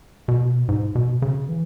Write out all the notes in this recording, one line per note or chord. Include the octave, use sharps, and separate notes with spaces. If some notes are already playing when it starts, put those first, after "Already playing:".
B2
G#2
B2
C#3
E3